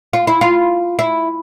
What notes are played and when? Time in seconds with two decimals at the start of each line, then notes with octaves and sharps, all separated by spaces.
0.13 F4
0.27 E4
0.41 F4
0.99 E4